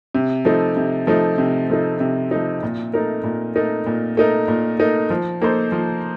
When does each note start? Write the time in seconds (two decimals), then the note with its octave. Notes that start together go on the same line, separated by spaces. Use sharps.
0.15 C3
0.45 F3 A3 D#4
0.77 C3
1.07 F3 A3 D#4
1.38 C3
1.70 F3 A3 D#4
2.00 C3
2.31 F3 A3 D#4
2.63 A#2
2.94 A3 D#4 A#4
3.24 A#2
3.56 A3 D#4 A#4
3.86 A#2
4.17 A3 D#4 A#4
4.48 A#2
4.79 A3 D#4 A#4
5.10 F3
5.42 A#3 D#4 A4 C5
5.72 F3